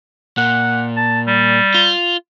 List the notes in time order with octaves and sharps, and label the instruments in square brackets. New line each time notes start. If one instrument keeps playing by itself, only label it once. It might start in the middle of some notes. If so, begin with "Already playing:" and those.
[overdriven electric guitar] A#2 [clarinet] F#5
[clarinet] A5
G3
[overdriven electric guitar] F4